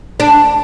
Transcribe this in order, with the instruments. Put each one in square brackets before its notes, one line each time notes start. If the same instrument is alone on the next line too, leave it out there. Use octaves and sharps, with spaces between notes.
[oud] D4